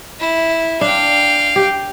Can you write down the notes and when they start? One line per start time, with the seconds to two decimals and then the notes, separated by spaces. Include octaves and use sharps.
0.20 E4
0.81 D4 F5 G5
1.56 G4